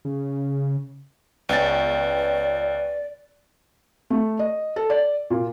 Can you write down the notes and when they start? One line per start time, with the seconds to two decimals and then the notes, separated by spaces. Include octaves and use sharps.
0.05 C#3
1.49 C#2 B3 C#4 D5 G5 A6
4.10 A3
4.39 D#5
4.76 A4
4.90 D5
5.30 A#2